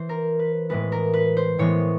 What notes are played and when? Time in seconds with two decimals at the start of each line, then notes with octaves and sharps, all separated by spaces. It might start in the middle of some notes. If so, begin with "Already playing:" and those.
Already playing: E3 C5
0.09 A#4
0.39 B4
0.69 A2 E3 G#3 B3 B4
0.92 A#4
1.14 B4
1.37 C5
1.59 A2 E3 G#3 B3 C#5